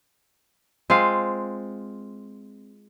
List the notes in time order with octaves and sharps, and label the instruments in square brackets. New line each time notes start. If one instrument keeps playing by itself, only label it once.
[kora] G#3 C4 F4 F5